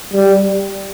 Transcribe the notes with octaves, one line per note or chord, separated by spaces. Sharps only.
G3